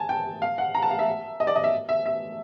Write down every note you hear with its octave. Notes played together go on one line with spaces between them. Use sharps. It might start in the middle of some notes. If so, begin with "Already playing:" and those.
Already playing: G#5 A5
G5
F5
F#5
A#5
A5
F5
E5
D#5
D5
D#5
E5
E5
E5